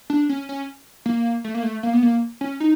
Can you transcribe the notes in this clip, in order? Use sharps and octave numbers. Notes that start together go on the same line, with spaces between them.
D4
C#4
C#4
A#3
A3
A#3
A3
A#3
B3
A#3
C#4
D#4